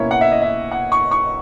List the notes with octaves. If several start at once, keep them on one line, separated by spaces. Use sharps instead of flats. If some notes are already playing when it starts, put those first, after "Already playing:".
Already playing: B2 A#3 C#4 E4 C#5
F#5
E5
D#5
E5
F#5
C#6
C#6